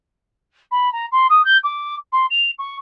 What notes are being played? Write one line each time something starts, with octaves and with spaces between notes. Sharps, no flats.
B5
A#5
C6
D#6
G6
D6
C6
F7
C#6